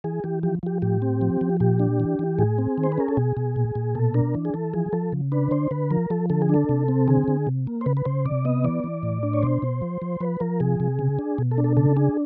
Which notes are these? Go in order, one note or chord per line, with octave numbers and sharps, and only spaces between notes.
E3 G#4
E3 G4
F3 G4
F3 G4
A2 G4
C4
F3
F3
A#2 G4
D4
E3
E3
A2 G#4
C4
D#3
C5
B4
C#4 A#4
A4
B2 G#4
B2
A#2
A#2
B2 A4
D4 A#4
E3
G#4
E3 A4
F3 G#4
F3 A4
C#3
D4 B4
D3 C5
D3 B4
F3 A#4
F3 A4
D3 A4
G#4
D4 A4
C3
C4
D3 G#4
D3
C3
A#3
C5
C#3 B4
B4
C#3 C5
C3 D5
B3 D#5
E3 D5
E3
A2
D4
C#5
B2 C5
B2
F3
F3
F3 B4
F3 A#4
C3 G#4
C3
C#3
D4
B2
A4
D4
A4
C#3 A4
D4 G#4